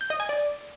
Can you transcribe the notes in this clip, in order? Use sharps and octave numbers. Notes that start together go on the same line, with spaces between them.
G6
D#5
G#5
D5